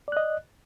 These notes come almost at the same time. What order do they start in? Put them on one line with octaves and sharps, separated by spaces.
D5 F#6 D#5